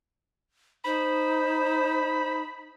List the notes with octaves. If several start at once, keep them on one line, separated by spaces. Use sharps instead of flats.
D#4 C5 B5